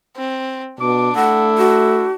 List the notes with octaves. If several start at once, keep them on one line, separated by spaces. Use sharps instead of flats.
C4
B2 D4 D6
A3 E4 F#5
F#4